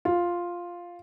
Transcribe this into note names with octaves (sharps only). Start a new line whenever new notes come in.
F4